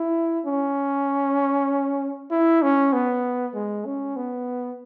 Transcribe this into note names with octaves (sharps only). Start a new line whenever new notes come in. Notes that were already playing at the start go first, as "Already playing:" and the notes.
Already playing: E4
C#4
E4
C#4
B3
G#3
C#4
B3